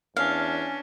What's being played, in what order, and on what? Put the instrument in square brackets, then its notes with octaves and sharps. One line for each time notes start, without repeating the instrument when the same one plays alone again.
[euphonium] E2 [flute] C#4 [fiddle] D4 [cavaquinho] F5